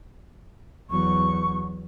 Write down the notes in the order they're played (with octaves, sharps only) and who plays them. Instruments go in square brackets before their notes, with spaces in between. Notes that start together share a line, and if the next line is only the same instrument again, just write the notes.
[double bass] E2 F#3 [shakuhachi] C#6